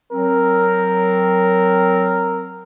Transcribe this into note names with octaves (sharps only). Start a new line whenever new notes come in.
F#3 C4 A#4